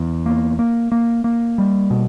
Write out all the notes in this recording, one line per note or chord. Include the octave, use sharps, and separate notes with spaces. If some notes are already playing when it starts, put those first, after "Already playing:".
Already playing: E2
A#3
A#3
A#3
A#3
G3
B2